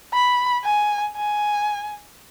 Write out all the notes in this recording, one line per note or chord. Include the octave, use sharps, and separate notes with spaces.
B5
G#5
G#5